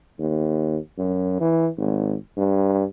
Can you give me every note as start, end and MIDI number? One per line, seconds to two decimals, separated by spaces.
0.19 0.78 39
0.98 1.39 42
1.41 1.68 52
1.78 2.15 32
2.37 2.84 43